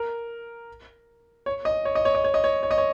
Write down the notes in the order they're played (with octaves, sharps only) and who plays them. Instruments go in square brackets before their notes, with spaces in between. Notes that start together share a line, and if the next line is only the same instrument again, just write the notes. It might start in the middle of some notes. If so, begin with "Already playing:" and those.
Already playing: [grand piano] A#4
C#5
D#5
C#5
D#5
C#5
D#5
C#5
D#5
C#5
C#5
D#5
C#5